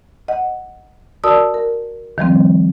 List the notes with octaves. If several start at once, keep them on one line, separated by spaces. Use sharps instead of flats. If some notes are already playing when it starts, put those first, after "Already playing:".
D#5 F#5
F#4 A#4 D5 A5 D#6 E6
A#4
D#3 F3 G3 C4